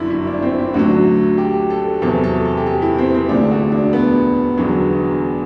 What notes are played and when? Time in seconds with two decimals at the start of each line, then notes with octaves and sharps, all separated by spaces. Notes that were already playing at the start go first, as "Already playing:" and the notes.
Already playing: G1 F#2 D3 F#3 D4 E4
0.10 E4
0.27 D4
0.42 C4
0.59 E4
0.74 D2 D3 F#3 F#4
1.38 G4
1.70 A4
2.02 E2 C3 F#3 A4
2.24 A4
2.45 A4
2.57 G4
2.67 A4
2.82 E4
2.98 C4
3.14 C4
3.29 E1 D2 D3 D4
3.51 F#4
3.72 D4
3.93 B3
4.58 E1 E2 D3 F#3